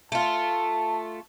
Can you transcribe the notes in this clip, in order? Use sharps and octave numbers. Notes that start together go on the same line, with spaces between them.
A3 F4 A5